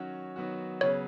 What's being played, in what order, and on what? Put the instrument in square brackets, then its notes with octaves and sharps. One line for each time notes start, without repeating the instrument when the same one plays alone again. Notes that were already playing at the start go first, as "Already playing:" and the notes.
Already playing: [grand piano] D#3 F#3 C#4 F#4
D#3 F#3 B3 F#4
[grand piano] C#3 F#3 B3 [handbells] C#5